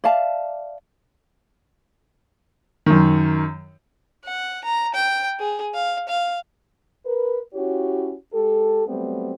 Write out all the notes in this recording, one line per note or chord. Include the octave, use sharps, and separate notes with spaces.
D5 E5 F5 A5
F#2 D#3
F#5
A#5
G5
G#4
F5
F5
A#4 B4
C#4 E4 F#4 G4 C#5
G#3 G4 A4
F#3 G3 A3 B3 C4